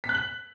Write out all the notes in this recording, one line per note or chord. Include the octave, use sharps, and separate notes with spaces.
B6
F#6
F#7